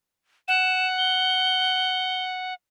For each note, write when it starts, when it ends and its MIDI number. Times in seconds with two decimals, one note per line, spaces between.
0.48 2.54 78
0.48 0.87 100
0.98 2.24 103